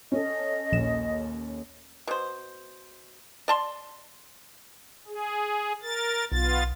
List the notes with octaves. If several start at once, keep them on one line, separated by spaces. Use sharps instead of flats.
C#4 A4 D#5
A#1 D#2 E7
B2 C5
D5 A5 C6
G#4
A#4 A6
B1 B3 F4 A6